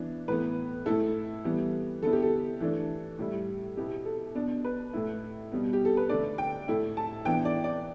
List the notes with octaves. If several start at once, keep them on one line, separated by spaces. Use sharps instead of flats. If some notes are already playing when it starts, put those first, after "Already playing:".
Already playing: E3 B3 D4
A2 E3 B3 B4
A2 A3 E4 A4
E3 G3 B3
D3 B3 E4 A4
G4
A4
E3 A3 D4
A2 G3 E4
B2 B3 E4 G4
A4
B2 B3 D4
B4
A2 A3 E4
B2 G3 B3
G4
A4
B4
D3 A3 D4 D5
G5
A2 A3 E4
A5
E3 B3 D4 G5
D5
D5